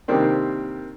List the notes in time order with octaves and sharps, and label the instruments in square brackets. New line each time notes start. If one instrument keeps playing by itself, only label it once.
[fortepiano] C3 D#3 G3 A#3 C4 D4